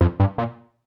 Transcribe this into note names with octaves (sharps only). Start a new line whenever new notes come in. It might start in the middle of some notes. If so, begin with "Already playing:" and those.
F2
G2
A#2